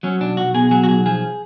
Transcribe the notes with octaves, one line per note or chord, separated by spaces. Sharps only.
F#3 C#4
B1 D4
B1 F#4
B2 G#4
F#3 G#4
F#4
B1 G#4
F3 G#4